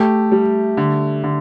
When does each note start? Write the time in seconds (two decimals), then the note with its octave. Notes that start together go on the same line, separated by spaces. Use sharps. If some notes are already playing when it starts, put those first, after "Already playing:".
Already playing: A3 G4
0.32 G3
0.77 D3
1.24 D3